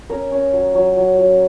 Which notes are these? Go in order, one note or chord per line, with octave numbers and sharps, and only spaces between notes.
C#4 A#4
C#4
F#3
F#3
F#3
F#3